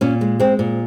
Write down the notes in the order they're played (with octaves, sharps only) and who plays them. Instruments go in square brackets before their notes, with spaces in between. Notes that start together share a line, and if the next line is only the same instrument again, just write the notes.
[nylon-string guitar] A#2 C#4
G#3
G#3 C4
A#2